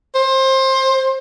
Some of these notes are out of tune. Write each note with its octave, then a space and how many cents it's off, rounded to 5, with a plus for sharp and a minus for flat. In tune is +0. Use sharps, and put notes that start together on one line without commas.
C5 +20